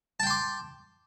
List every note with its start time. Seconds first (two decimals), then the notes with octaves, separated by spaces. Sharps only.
0.20 A5
0.23 G5
0.27 C6
0.30 D6